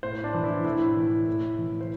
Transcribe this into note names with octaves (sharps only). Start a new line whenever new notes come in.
A2 C5
D4
E3
E4
A2 E4
E3
A2
E3
C5